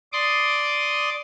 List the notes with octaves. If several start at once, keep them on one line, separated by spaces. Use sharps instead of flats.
D5 C6 D6 D#6